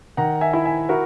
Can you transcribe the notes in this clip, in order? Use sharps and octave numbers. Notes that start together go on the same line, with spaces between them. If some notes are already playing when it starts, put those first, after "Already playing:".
D#3 F#5 A#5
E5 G#5
E4
E5 G#5
E4 F#4 A#4